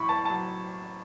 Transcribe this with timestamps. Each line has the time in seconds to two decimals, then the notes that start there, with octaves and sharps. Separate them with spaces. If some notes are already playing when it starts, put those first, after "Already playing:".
Already playing: A1 A2 F#3 B5 C#6
0.09 B3 A5
0.25 F#3 A5